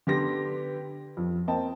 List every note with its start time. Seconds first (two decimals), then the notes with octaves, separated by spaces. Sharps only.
0.07 D3 B3 G4 B4 C6 A#6
1.17 F2
1.47 A#3 C4 D#5 G5 A5